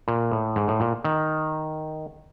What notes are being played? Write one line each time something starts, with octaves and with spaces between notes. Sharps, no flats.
A#2
A2
G#2
A2
A#2
D#3